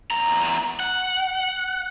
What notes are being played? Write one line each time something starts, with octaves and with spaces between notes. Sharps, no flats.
E2 A#5
F#5